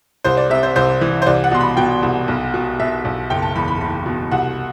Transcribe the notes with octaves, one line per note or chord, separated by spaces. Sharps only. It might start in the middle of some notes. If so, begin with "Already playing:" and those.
C2 C5
D5
C3 E5
C5
C2 C5
E3
C5
C2 D5
F#5
B2 C6
B5
B2 G5
C2
B1
B2
B2 E5
B1
F#1 G5
A5
E2 B5
B5
F#1 B5
B2
C2 F#5